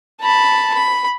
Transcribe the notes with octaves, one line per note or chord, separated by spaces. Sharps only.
A5 B5
B5